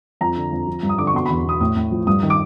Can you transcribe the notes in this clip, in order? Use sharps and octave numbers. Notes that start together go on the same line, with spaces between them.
F2 A#5
D3
F2
F3
G2
D#6
D3 D6
C#6
B2 C6
E2 B5
B2 D#6
A2 D#6
A2
F3
G2 D#6
D#3
D6